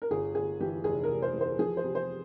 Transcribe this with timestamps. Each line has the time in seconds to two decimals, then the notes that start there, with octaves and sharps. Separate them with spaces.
0.02 A#4
0.11 G1 G#4
0.35 G1 G#4
0.60 E3 G4
0.84 F1 G#4
1.03 A#4
1.09 F1
1.22 C5
1.34 E3
1.41 C5
1.59 F3 G#4
1.77 C5
1.84 C3
1.95 C5